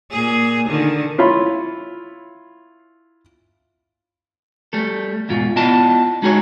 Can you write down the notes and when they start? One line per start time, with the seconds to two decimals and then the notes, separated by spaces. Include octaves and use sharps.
0.11 A#2 G#4
0.69 D3 D#3
1.18 E4 F4 C#5 B5
4.73 G3 A3 A4
5.29 E2 G#2 B2 F4
5.56 B3 E4 F4 D5 D#5 A5
6.22 G#3 D#4 F#4 G#4 C#5